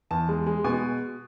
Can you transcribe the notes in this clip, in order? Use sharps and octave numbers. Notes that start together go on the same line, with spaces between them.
E2 A5
G#3
G#3
B2 G#5